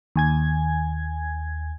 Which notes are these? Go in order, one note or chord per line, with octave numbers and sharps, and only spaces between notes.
D#2 G#5 G#6